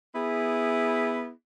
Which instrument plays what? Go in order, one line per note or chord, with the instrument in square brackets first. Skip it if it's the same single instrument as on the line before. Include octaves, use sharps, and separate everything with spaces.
[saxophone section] B3 E4 G#4